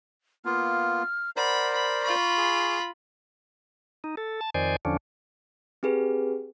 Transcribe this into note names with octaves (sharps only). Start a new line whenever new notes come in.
A#3 B3 F4 F6
A#4 C5 D5 F#5 B5
B5
F4 B5 C#6
G#4
D#4
A4
A5
F2 D#3 C5 D5 G#5
E2 D3 F3 C#4 D4
C4 G4 G#4 B4